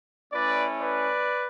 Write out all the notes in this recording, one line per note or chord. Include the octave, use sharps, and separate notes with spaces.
A3 C#4 E4 B4 D5
B4 D5